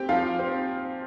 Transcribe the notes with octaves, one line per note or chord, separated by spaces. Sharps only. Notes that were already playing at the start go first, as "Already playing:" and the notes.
Already playing: C4 G4 G5
F3 F4 F5
C4